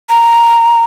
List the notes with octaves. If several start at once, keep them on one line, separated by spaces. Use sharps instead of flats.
A#5